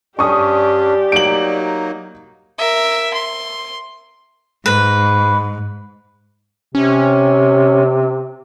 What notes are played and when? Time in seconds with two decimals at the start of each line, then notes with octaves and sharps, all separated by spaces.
0.19 G2 C#4 D4 G4 D5 C#6 D#6
1.12 F#3 A#3 D#4 D7 F#7
2.59 A#4 E5
3.14 C6
4.66 G#2 B4
6.75 C3 C#4